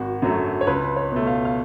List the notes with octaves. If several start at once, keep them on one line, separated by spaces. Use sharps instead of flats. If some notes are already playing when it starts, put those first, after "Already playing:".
Already playing: G#1 F#4
F#2 D3 F#3 A3
C#5
C#2 B4
C#5
B2 A3
F5
F5